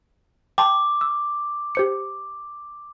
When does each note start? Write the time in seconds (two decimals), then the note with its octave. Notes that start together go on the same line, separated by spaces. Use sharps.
0.58 G5 A5 C6 D6
1.01 E6
1.75 G4 C5 C#7